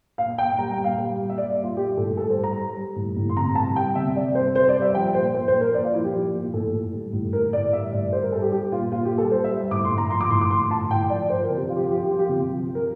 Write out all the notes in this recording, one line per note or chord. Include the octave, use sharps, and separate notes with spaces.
A#2 F5
A#2 G5
G3 A#5
G5
A#2
F5
G3
A#2
E5
G3 D5
A#2
F4
G3 G4
A2 A4
G3 A4
C5
G3
A#5
G3
G3
A2
A2
C6
C3 A#5
G3 A5
G3 G5
C3 E5
G3 D5
C3 C5
G3 C5
D5
G3
E5
F3 G5
A#2 C5
A#2 C5
C5
F3
A#4
A#2 D5
F4
F3 E4
G4
F3
A#2
A2 A4
A2
G3
A2
A2 A#4
A2 D5
G3 E5
A2 D5
G3 C5
A#4
G3 A4
G4
G3 G4
A#2 F4
A#2 F4
G4
G3
A4
G3 C5
E5
G3
A2 D6
C6
A2
A#5
F3 C6
D6
A2 C6
D6
A2 C6
A2 A5
A2 G5
F3 D5
F3 C5
A#4
C3
G4
F3 F4
G4
F4
F3 G4
F4
G4
F3 F4
G4
F4
C3
F3
F3
A#4